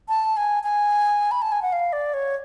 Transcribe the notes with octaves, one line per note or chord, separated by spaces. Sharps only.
A5
G#5
G#5
B5
A5
G#5
F#5
F5
D5
C#5